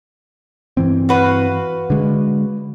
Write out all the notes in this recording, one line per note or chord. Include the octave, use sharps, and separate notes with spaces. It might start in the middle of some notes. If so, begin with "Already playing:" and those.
G2 E3 C4
F#4 B4 F5
D3 G#3